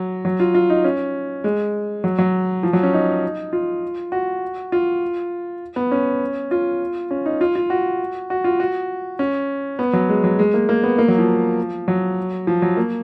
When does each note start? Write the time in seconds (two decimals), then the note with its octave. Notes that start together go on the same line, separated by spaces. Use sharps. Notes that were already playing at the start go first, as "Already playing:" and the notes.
Already playing: F#3
0.25 F#3
0.40 F4
0.55 F4
0.70 D#4
0.84 C#4
1.44 G#3
2.04 F#3
2.18 F#3
2.63 F3
2.73 F#3
2.83 C#4
2.93 D#4
3.53 F4
4.12 F#4
4.72 F4
5.76 B3
5.91 C#4
6.51 F4
7.11 C#4
7.26 D#4
7.41 F4
7.55 F4
7.70 F#4
8.30 F#4
8.44 F4
8.60 F#4
9.19 C#4
9.79 B3
9.93 F#3
10.09 G#3
10.24 F#3
10.39 G#3
10.54 A#3
10.69 A#3
10.83 B3
10.98 A#3
11.08 F#3
11.18 F3
11.88 F#3
12.47 F3
12.62 F#3
12.77 A#3